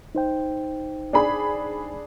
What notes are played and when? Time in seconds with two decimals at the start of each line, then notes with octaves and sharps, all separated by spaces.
0.15 D#4 C5 G5
1.13 D4 G#4 B5